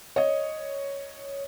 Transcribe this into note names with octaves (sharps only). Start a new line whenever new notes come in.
C#5 D#5